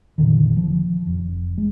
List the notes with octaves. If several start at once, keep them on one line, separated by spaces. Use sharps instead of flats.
F1 A#2 D3 D#3
F3
F1
G#3